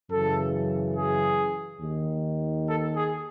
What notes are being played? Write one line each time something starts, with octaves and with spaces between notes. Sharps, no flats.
F#2 C#3 E3 A4
G#4
D#2 D#3
A4
G#4